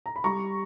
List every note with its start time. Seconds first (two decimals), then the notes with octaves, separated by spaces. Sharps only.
0.06 A#5
0.16 B5
0.24 G3 A#5 C#6